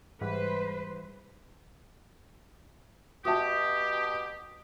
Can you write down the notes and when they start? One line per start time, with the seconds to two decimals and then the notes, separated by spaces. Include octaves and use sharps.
0.21 G#2 E3 G3 B4 C5
3.25 B2 F#4 G4 E5 A5 D#6